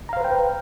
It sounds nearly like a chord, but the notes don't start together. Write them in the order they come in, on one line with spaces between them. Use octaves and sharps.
A#5 F5 C5 B4 G5